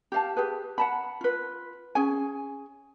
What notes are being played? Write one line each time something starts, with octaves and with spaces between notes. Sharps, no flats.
G4 F5 A5
G4 G#4 B4
F#5 A5 B5
F4 B4
C#4 G#4 G#5